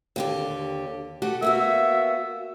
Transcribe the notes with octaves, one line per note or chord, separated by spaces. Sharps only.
D#2 D3 G4
A3 F#4 G4
A#3 B3 F#4 E5